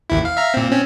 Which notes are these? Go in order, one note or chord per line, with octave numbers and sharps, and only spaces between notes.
A1 D#2 E4
F5
E5 F5 A#5
A#2 C4
C4 C#4